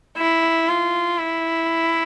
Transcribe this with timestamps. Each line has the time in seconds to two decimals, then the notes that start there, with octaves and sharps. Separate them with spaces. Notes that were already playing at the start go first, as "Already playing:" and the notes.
0.17 E4
0.68 F4
1.19 E4